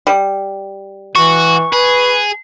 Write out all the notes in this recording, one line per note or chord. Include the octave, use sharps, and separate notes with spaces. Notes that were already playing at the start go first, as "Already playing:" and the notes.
G3
E3 F#4 C#6
G#4 B4